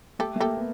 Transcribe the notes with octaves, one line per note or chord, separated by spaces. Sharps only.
A3 G4 A4
A3
A#3 G4 A4
B3